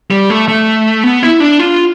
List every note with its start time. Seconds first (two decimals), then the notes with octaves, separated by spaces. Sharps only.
0.11 G3
0.30 A3
0.48 A3
1.03 B3
1.23 E4
1.40 D4
1.59 F4